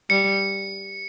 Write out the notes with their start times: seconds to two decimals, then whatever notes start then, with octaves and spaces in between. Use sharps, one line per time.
0.10 G3 C#7